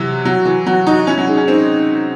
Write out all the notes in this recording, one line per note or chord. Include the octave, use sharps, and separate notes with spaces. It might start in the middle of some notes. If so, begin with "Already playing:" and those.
Already playing: C3 E3 F#3
F#3 F#4
E3
F#3 F#4
D#4 F#4
C#4 E4
F#3
G#3 D#4
C#4
C4 D#4